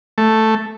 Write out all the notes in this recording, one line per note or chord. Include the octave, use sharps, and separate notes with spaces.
A3